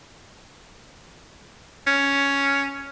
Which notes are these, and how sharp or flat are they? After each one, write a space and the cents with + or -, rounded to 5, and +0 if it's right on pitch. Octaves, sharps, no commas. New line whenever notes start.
C#4 +5